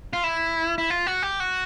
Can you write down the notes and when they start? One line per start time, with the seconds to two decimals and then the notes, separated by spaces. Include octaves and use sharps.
0.13 F4
0.24 E4
0.78 E4
0.90 F4
1.07 F#4
1.23 G4
1.40 F#4